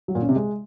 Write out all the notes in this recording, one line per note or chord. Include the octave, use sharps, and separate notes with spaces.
F#3
A#2
C#4
C3
G#3